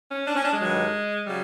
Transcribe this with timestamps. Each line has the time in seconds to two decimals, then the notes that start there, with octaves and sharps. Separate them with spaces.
0.10 C#4
0.26 D4
0.35 C#4
0.44 D4
0.52 G#3
0.60 G2 D#3 F#3
1.27 C#3 F#3 G3